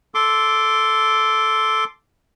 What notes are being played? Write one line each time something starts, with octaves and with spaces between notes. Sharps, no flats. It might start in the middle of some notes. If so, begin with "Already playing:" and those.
A4 C6 D6